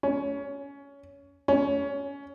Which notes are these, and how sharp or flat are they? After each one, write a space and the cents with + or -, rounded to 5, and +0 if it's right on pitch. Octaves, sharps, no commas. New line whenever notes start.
C#4 +20
C#4 +20